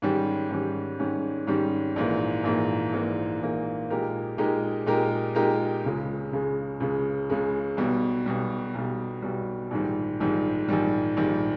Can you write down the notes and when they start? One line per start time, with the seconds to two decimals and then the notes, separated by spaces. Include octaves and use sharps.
0.02 G#2 D#3 G3 C#4 G4
0.51 G#2 D#3 G3 C#4 G4
0.99 G#2 D#3 G3 C#4 G4
1.47 G#2 D#3 G3 C#4 G4
1.96 A#1 G#2 E3 A#3
2.44 A#1 G#2 E3 A#3
2.93 A#1 G#2 E3 A#3
3.41 A#1 G#2 E3 A#3
3.90 A#2 G#3 D#4 G4 A#4
4.38 A#2 G#3 D#4 G4 A#4
4.86 A#2 G#3 D#4 G4 A#4
5.35 A#2 G#3 D#4 G4 A#4
5.84 C#2 C#3 G#3
6.32 C#2 C#3 G#3
6.80 C#2 C#3 G#3
7.30 C#2 C#3 G#3
7.77 B1 B2 G3
8.26 B1 B2 G3
8.74 B1 B2 G3
9.22 B1 B2 G3
9.71 A#1 G#2 D#3 G3
10.20 A#1 G#2 D#3 G3
10.68 A#1 G#2 D#3 G3
11.17 A#1 G#2 D#3 G3